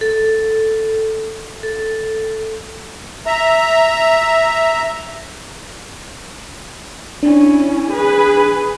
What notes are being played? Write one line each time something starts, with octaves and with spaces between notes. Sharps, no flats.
A4
A4
E5 A#5
C#4 D4 E4
G#4 B4